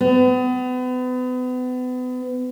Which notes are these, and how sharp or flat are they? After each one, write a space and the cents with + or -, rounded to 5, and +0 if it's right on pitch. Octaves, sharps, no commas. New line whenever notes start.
B3 +35